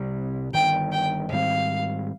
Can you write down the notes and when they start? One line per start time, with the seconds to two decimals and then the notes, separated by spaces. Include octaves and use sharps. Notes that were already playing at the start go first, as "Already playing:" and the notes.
Already playing: C2 C3 G3 C4
0.53 G1 G2 D#3 G5
0.92 G5
1.32 G#2 D#3 G3 C4 F5